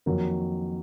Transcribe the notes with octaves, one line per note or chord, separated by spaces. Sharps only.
F2 D#3 F#3 A#3 A#4